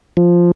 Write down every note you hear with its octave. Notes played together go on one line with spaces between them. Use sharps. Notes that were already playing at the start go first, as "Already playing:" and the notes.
F3